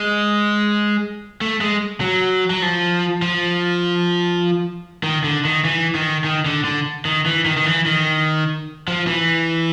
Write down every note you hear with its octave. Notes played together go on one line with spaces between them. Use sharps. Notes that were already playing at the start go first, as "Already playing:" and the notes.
Already playing: G#3
A3
G#3
F#3
F#3
F3
F3
D#3
D3
D#3
E3
D#3
D#3
D3
D3
D#3
E3
D#3
D#3
E3
D#3
F3
E3